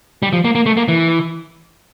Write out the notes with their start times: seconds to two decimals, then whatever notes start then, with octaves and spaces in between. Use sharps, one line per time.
0.23 G3
0.33 F3
0.45 A#3
0.55 A#3
0.66 A3
0.77 A#3
0.88 E3